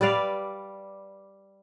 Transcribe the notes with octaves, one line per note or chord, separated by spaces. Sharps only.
G3 B4 D5 F5